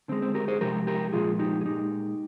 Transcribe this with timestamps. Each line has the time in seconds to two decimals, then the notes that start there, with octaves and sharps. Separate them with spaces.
0.08 D3 G#3 C4
0.22 C4
0.34 G4 A#4
0.48 G#4 C5
0.61 C3 F3 G#3 G4 A#4
0.87 G4 A#4
1.13 A#2 F3 G#3 F4 G#4
1.39 D#4 G4
1.61 G#4
1.65 A#2 G#3 D#4 G4